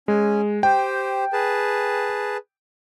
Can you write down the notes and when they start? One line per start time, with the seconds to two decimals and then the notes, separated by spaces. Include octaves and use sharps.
0.08 G#3 C#4 G#5
0.63 G4 C5 G5
1.33 G#4 B4 A5